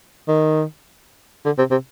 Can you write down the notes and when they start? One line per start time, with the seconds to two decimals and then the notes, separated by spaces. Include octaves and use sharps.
0.28 D#3
1.45 D3
1.58 C3
1.71 C3